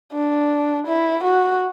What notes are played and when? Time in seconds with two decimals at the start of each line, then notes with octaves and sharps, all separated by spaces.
0.13 D4
0.87 E4
1.24 F#4